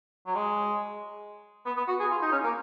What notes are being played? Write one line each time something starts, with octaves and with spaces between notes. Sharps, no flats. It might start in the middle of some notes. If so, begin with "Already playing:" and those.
F#3
G#3
B3
B3
F#4
G#4
F4
D#4
C#4
A#3